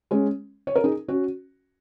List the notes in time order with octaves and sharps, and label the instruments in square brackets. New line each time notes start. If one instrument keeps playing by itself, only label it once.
[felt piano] G#3 C#4
C#5
A#4
D#4 G#4
C#4 F#4